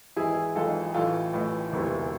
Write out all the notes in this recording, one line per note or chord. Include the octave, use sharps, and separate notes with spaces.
G#1 G#2 E3 E4 G#4
G#1 G#2 E3 F4 A4
A1 A2 E3 F4 A4
A1 A2 E3
E1 D2 C3 E3